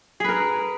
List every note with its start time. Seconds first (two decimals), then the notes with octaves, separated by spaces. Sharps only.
0.20 G#4
0.24 B4
0.29 A#4